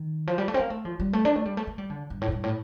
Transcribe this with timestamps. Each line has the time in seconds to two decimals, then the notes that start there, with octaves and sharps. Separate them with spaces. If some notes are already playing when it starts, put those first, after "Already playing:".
Already playing: D#3
0.27 F3
0.38 G3
0.48 A3
0.54 C4
0.59 A#3
0.70 A3
0.85 F3
1.00 G3
1.13 A3
1.25 D4
1.36 A3
1.45 G3
1.57 A3
1.67 A3
1.78 G3
1.90 D3
2.10 G2
2.21 A2
2.28 F2
2.32 G2
2.43 A2